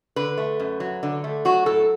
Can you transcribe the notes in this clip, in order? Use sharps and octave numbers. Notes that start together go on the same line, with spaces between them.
D3 B4
A3
F#2
F#3
D3
A3
F#3 F#4
A2 A4